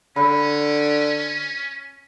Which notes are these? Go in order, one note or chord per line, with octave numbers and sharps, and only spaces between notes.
D3 C#4 B5